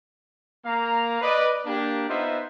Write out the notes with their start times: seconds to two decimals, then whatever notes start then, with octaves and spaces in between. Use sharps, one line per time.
0.65 A#3 F5 A#5
1.22 B4 D5 D#5
1.66 A#3 D4 G4
2.08 B3 D#4 F4 C5 D#5 E5